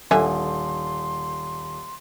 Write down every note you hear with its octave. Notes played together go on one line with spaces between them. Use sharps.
D#1 D3 E5 G#5 C6